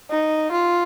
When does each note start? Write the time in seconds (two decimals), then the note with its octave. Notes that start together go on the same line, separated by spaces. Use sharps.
0.10 D#4
0.52 F4